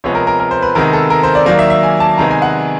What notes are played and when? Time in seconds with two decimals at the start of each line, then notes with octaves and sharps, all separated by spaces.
0.04 C3 F3 G#3 B3 C#5
0.15 A#4
0.27 A#4
0.40 A#4
0.51 C5
0.62 B4
0.75 C3 D#3 G#3 B3 A#4
0.93 A4
1.10 A#4
1.23 C5
1.35 D5
1.46 D#3 F#3 A#3 D5
1.59 E5
1.70 E5
1.83 G#5
2.00 A5
2.18 C3 D#3 G#3 B3 A#5
2.31 G#5
2.42 F#5